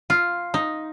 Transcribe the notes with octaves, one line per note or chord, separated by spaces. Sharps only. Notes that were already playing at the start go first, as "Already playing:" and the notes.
F4
D#4